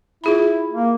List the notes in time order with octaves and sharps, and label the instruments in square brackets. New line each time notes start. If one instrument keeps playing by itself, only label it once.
[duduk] E4 [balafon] F4 G#4 B5
[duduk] A#3